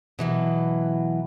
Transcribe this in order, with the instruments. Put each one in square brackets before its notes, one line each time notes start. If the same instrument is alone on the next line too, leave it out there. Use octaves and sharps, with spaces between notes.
[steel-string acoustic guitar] B2 E3 F#3